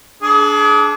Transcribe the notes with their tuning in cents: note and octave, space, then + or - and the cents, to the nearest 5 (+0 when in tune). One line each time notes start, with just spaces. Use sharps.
D4 -15 G#4 +30